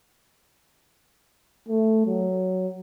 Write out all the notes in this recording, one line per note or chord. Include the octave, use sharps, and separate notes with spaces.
A3
F#3